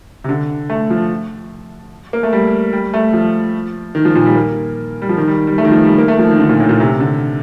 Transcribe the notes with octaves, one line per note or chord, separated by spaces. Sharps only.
C3
D3
A3
F3
A#3
A3
G3
G3
A3
F3
D#3
F3
A#2
G3
A#3
G3
F3
D#3
G3
G3
A3
D#3
F3
G3
A#3
A3
F3
D#3
D3
A#2
A2
A#2
C3
D3